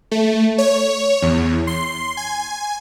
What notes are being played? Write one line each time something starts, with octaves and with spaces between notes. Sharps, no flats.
A3
C#5
E2
C6
G#5